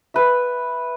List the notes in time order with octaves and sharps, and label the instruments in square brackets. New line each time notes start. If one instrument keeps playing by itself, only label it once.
[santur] B4 E5